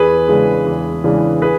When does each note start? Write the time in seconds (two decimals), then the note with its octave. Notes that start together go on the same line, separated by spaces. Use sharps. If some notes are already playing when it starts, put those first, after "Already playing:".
Already playing: E2 G#4 B4
0.28 C#3 E3 G#3 D4
0.66 E2
1.04 C#3 E3 G#3 D4
1.42 G#4 B4